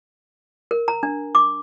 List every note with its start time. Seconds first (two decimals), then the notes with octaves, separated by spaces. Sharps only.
0.71 A#4
0.88 A#5
1.03 D4
1.35 D6